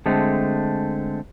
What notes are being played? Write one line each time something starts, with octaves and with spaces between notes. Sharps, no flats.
D3 G#3 A3 C4